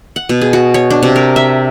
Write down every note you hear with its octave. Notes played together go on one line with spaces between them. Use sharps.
F#5
B2
G#4
F#4
C#5
D4
C3
A#4
E5